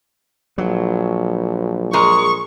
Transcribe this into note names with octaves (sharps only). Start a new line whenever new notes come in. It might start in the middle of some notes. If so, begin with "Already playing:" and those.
A#1 F#3
G#3 G#4 A#4 C#6